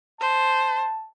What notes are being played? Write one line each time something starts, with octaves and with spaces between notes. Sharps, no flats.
C5 A5